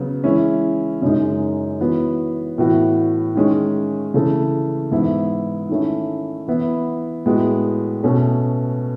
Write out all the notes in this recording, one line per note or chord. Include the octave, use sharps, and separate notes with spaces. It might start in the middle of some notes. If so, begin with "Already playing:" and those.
Already playing: C#3 F#3 B3
E3 G#3 C#4 E4
F#2 C#3 G#3 D#4
E3 B3 F#4
A2 E3 B3 F#4
D#3 G#3 C#4
C#3 E3 A3
G#2 E3 B3 E4
D#3 A3 C#4 E4
E3 B3 E4
A2 G#3 B3 F#4
B2 A3 C#4